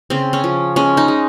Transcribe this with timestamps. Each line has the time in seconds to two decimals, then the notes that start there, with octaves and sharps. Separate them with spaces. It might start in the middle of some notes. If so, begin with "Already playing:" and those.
0.10 C#3 C4
0.33 C#4
0.44 F3
0.76 G#3 C#4
0.97 D#4
1.08 G#3